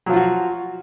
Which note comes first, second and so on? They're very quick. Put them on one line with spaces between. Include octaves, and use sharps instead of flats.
F#3 F3 F4 F#4